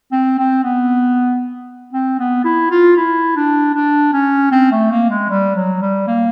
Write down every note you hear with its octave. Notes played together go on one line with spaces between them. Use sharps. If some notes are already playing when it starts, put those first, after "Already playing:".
C4
C4
B3
C4
B3
E4
F4
E4
D4
D4
C#4
C4
A3
A#3
G#3
G3
F#3
G3
A#3